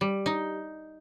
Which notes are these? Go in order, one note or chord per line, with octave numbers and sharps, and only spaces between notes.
G3
D#4